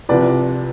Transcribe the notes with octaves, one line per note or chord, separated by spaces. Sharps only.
C2 C3 F3 B4 D5